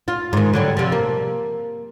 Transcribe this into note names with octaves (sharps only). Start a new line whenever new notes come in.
F4
G#2 D#3
D3 F#3 G3
C3 F3
A#3